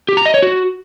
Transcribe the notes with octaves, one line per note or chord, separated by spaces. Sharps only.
G4
A#5
D#5
C#5
F#4